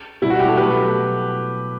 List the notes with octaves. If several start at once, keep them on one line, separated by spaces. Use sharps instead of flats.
B2 G3 E4
F#4
E4 G4
F#4 A4
B2 F#3 A3 G4 B4